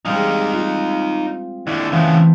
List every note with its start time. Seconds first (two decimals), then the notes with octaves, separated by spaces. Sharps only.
0.05 G3 G#3 C4 D#4 F5
0.53 F4
1.67 D#2 D3 E4
1.92 C#3 E3 A3 B3 C4